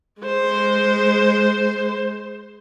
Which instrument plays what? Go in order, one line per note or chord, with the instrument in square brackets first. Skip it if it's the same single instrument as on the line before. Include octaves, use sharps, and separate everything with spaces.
[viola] G#3 C5